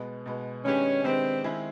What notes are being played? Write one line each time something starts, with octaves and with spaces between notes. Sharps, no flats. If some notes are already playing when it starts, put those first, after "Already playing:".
Already playing: B2 G#3 B3
B2 G#3 B3
D#3 G#3 B3 C#4 D4 G4
D#3 G#3 B3 C4 D4 G4
D#3 G#3 C4 E4 G#4